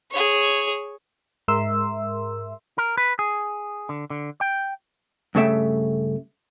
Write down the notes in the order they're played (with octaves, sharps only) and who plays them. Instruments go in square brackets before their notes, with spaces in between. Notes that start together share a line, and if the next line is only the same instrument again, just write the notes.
[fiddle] G#4 C#5
[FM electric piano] G#2 G#3 A#4 E5 C6 E6
[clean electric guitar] A#4
B4
G#4
D3
D3
G5
[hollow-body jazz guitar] G2 C#3 A3 E5 G5